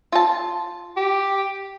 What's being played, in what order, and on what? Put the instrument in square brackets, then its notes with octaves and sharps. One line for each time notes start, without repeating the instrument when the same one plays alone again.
[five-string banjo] F4 A5
[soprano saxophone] G4